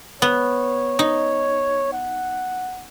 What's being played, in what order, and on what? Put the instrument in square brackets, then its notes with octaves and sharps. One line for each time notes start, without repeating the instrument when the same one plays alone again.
[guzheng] B3 [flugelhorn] C#5
[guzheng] D#4
[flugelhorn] F#5